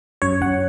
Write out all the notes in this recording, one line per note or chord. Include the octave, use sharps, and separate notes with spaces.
F#2 C#5
F#2 F#5